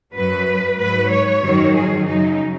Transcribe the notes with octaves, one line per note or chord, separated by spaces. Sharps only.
F#2 F#3 B4
G#2 F#3 B4
C#5
F#2 D#3 F#3
G#4
F#2 C#3 F#3 D#4